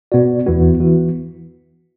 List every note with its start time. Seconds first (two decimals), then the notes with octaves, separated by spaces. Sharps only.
0.12 B2 B3 F#4 D5
0.46 E2 E3 B3 F#4
0.80 E3 B3 F#4